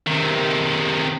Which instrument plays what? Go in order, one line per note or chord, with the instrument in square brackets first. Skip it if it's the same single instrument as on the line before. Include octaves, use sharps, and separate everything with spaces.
[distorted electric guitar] C3 D#3